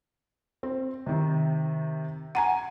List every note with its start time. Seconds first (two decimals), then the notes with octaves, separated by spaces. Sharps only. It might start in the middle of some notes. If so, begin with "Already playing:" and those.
0.63 C4
1.06 C3 D#3
2.35 F#5 G#5 A#5 D#7